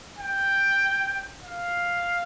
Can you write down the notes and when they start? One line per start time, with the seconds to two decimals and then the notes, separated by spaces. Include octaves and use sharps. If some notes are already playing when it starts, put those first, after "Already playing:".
0.18 G5
1.43 F5